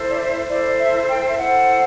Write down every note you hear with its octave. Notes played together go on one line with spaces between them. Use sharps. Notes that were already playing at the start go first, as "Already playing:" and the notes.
Already playing: E4 A4 C5
D5
E5
E4 A4 C5 D5
E5
G5
E5
E4 A4 C5 F#5